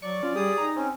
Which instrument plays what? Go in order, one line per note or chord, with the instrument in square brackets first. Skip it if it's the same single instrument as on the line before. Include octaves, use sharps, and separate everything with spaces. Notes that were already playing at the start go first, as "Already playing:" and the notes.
[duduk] F#3 [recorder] D5 [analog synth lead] C#6
[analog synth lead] C#4 [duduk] F4
[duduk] G3 [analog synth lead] G4 [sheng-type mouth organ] G#4 D#6
[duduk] D#4 [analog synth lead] A#5
[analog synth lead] C4 [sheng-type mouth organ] C#4